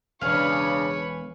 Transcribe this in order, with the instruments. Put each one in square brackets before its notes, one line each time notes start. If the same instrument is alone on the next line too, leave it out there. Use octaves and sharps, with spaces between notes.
[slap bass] E1 [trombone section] C#3 D4 [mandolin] G#4 F5 [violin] B4 C#5